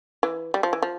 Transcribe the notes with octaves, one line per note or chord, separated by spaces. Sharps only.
E3
G3
F3
E3
F3